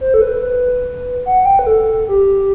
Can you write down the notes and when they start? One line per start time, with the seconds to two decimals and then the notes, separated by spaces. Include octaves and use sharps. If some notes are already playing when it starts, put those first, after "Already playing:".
0.01 C5
0.14 A4
0.22 B4
0.42 B4
1.26 F#5
1.45 G5
1.59 B4
1.67 A4
2.08 G4